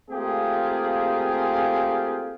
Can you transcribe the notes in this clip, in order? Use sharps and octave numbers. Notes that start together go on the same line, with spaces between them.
A3 A#3 C4 F4 G4 G#4